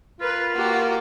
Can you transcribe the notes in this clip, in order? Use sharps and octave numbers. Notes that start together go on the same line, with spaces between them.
F4 A#4 B4
A#3 F#4 G4